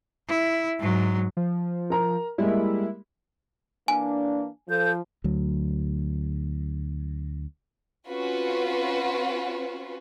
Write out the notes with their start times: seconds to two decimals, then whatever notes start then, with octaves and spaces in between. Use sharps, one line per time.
0.28 E4
0.80 G#2 F#3
1.37 F3
1.90 A#4 A#5
2.38 G3 G#3 A#3 E4
3.88 E3 A#3 D4 G#5
4.69 F3 A4 G6
5.24 D2 F#3
8.07 C4 C#4 F4 F#4 B4